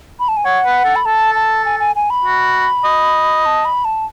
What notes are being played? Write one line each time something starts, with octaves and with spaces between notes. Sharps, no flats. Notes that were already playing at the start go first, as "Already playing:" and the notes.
B5
A5
G#5
C#5 F#5
B4
A4
B5
A4 A5
A5
G#5
G#5
G#5
B5
F#4
D#5
A5
B5
A5